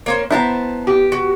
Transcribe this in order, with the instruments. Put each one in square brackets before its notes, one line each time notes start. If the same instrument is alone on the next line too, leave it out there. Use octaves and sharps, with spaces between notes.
[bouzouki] A#3 C#4 C5
[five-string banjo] B3 E4 [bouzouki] C5 A5 A#5
[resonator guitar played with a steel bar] G4
[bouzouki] F#4